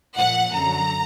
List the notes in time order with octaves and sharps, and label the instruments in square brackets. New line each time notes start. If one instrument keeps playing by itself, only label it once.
[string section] A#2 F3 F#5
F#2 D3 F#3 A#5